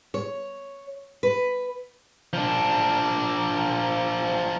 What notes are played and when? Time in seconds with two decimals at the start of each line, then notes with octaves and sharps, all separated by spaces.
0.14 C#5
1.23 B4
2.33 F3 D4